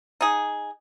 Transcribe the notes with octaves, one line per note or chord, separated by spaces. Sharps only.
D#4 G#4